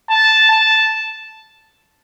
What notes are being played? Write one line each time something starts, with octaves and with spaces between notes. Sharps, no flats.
A5
A5